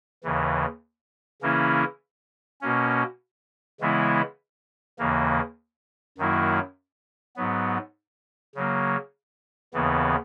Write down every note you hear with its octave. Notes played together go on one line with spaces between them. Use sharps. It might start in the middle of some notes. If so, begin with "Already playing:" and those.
D#2 C#3 E3
C#3 E3 A#3 C#4 E4
B2 A#3 C#4
C#3 E3 G#3 B3 E4
D#2 C#3 E3 A#3
F#2 D#3 F#3 A#3 E4
G#2 F#3 B3
C#3 F#3 A#3
D#2 C#3 E3 B3